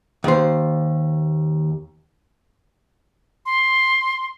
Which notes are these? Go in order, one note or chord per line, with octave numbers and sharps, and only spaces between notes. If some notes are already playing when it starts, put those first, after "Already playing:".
D#2 C5
C6